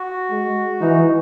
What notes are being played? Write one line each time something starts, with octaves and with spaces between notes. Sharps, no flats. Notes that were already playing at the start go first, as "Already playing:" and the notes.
Already playing: F#4
G#3
E3 D#4